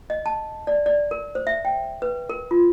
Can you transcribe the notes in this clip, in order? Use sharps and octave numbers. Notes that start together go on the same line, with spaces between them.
D#5
A5
D5
D5
A#4
C5
E5
G5
B4
A#4
F4